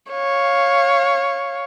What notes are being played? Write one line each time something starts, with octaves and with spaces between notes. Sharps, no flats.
C#5 F5